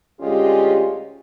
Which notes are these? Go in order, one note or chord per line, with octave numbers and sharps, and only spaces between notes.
D2 G#3 C#4 F4 G4